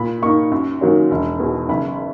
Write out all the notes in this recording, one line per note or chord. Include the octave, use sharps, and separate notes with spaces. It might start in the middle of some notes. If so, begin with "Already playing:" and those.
Already playing: A#2 B5
A#3 D#4 C#6
F#2
D#3 F#3 A#3 C#4
E1
E2 B2
F#1 B5